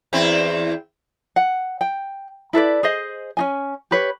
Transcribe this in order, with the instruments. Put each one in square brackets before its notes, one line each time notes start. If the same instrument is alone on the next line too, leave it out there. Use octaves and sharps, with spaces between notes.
[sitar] E2 C4 E4
[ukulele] F#5
G5
E4 A4 B4 D5
G#4 C5 D#5
C#4 D#4 G#5
G4 B4 C#5